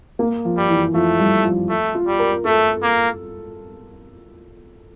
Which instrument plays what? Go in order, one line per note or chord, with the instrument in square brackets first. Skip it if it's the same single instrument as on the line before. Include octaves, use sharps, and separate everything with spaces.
[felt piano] A#3
F3
[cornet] G3
[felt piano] E3
[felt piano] F3 [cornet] A3
[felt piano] G3
F3
[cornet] A3
[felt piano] F4
[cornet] G3
[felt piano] A#4
[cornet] A3 [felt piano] A4
[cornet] A#3